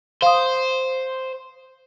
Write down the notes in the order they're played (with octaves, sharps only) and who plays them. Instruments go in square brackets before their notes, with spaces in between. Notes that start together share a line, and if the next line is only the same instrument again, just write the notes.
[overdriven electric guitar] C5 [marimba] F5 D#6